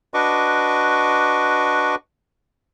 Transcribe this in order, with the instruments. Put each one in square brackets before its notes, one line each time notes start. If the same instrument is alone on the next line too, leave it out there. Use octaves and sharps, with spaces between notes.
[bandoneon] D4 F#4 B4 D#5 C#6 D6